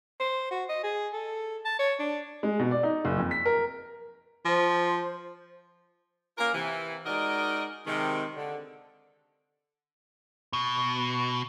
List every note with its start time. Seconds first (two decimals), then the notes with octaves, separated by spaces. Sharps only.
0.20 C5
0.51 F#4
0.69 D#5
0.83 G#4
1.13 A4
1.65 A5
1.79 C#5
1.99 D4
2.43 G#3
2.60 B2
2.71 D5
2.83 D#4
3.05 F#1
3.18 F2
3.31 B6
3.46 A#4
4.45 F3 C5
6.38 A#3 C#4 F4 A#4
6.53 C3 E3
7.06 G#3 D#4 F#4 A#4 D5 D#5
7.86 C3 D#3 G#3
8.36 D3
10.53 B2